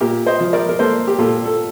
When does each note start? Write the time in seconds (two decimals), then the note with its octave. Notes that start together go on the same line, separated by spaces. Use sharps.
0.01 A#2 G4 A#4
0.27 C5 D#5
0.40 F3
0.53 A#4 D5
0.69 A#4
0.79 A#3 A4 C5
1.08 G4
1.19 A#2 F4 A4
1.46 A4